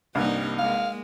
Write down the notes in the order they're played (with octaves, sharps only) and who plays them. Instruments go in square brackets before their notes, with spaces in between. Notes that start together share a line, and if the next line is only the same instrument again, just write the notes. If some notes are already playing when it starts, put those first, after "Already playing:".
[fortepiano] C2 G2 [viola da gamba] G3 A#3 D#4
[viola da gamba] G#3 A#3 [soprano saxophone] F5